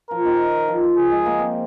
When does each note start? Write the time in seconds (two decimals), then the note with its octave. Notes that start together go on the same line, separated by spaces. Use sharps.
0.10 F3 A#4
0.25 D#3
0.68 F3
0.83 F3
0.97 G#4
1.11 G#3
1.26 A#3
1.39 C4